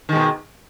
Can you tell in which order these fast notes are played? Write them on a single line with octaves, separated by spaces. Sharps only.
D#3 G#3 B2